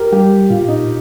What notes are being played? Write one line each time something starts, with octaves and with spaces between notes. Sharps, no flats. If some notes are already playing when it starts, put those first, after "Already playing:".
Already playing: G4 A#4
G3 G4
A#2 F4
D#4